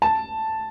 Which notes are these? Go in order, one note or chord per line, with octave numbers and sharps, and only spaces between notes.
A5